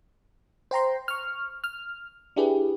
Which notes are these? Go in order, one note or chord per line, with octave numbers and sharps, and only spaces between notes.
C5 G5 A#5 C6
C#6 F6
F6
D4 E4 G4 G#4 B4